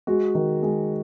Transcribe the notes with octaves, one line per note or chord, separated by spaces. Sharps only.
G#3 F#4
D#3
G#3